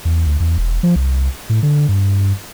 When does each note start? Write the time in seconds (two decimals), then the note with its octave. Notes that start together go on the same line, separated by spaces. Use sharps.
0.05 E2
0.26 D2
0.40 E2
0.58 E1
0.83 F3
0.96 C2
1.49 A2
1.63 D3
1.88 G2